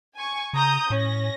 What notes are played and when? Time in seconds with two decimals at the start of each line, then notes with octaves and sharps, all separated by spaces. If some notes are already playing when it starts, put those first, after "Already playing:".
0.14 G#5 C#6
0.53 C#3 A#5 D#6 G6
0.90 A2 C#4 A#6